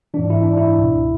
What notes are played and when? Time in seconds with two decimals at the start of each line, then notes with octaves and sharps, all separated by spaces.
0.14 G#2 E3 D4
0.30 E4
0.43 D4
0.57 E4
0.78 C#2 B2